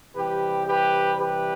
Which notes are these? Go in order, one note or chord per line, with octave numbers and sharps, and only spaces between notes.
C3 E3 G3 G4 B4
G4 B4
G4 B4